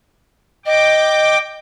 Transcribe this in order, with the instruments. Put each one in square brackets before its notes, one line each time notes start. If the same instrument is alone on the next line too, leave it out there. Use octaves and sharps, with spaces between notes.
[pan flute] D#5 [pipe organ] G5 D6